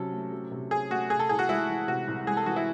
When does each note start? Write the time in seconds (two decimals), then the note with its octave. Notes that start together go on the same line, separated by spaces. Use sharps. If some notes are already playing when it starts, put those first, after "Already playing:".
Already playing: C3 F#3 C#4 A4
0.13 A3
0.32 F#3
0.51 C3
0.71 C#4 G#4
0.90 A3 F#4
1.10 C3 G#4
1.19 A4
1.29 C2 G#4
1.39 F#4
1.49 G#3 E4
1.69 E3
1.88 C3 F#4
2.07 C2
2.27 G#3 G#4
2.37 A4
2.46 E3 F#4
2.56 E4